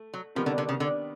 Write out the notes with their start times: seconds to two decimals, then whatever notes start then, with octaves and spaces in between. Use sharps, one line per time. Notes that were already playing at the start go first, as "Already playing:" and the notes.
Already playing: A3
0.14 F#3
0.35 C3 D#3 F3 G3 B3
0.46 D3
0.58 D3
0.69 C#3
0.80 D3